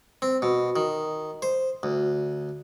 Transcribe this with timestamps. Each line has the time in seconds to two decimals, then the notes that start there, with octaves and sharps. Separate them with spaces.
0.22 C4
0.42 B2
0.76 D#3
1.42 C5
1.83 D2